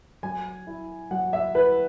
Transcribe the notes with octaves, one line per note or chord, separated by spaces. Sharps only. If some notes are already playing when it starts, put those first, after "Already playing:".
F#3 G#5
E4
F#3 F#5
E5
E4 B4